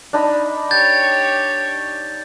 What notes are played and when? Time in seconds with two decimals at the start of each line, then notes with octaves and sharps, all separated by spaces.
0.13 D4 D#4 B5
0.71 G4 C#5 G6 A6